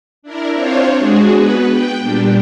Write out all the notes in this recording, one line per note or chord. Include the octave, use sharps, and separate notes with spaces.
D4 E4 A#4
C4 D4 F4 C5 C#5
G#3 D4 F#4 G#4
B3 B4
G5
A#2 G3 D4